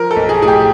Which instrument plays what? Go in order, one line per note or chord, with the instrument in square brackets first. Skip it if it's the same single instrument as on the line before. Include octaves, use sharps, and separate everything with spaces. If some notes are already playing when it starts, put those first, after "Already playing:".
Already playing: [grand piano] F3 A#4
A4
B1
G#4
A2 G#4
G4